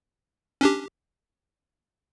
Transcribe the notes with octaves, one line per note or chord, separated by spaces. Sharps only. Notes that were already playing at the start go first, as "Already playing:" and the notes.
C#4 D4 G4